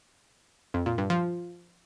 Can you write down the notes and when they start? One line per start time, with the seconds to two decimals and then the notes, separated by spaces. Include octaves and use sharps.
0.74 F2
0.86 A#2
0.98 G2
1.10 F3